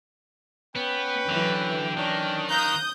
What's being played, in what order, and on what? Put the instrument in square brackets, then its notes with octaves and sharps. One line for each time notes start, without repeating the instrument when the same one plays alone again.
[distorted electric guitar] B3 [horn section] C#4 B4 [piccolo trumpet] G5
[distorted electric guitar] D3 [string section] E3 F#3
[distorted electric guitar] D#3 [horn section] C#4 D4
[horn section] F5 A#5 [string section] D#6 G6 [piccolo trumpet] F#6